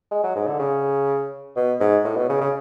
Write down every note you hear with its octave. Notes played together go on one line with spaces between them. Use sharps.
G#3
F#3
G#2
D3
C#3
B2
G#2
A2
B2
C#3
C#3